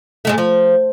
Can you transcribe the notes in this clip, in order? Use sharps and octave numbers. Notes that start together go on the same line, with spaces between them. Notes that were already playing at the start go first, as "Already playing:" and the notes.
G#2 G#3 A3
F3